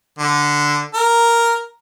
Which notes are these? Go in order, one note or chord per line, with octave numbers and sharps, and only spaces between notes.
D3
A#4